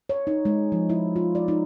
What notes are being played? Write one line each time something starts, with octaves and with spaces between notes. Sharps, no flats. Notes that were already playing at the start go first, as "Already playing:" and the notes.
C#5
D#4
G#3
F3
E4
F4
D5
D#4